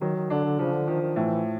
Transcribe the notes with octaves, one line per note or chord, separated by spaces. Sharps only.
D#3 F#3
D#3
D3 D4
D3
C#3 F3
D3
D#3 F3
D#3
A2 E3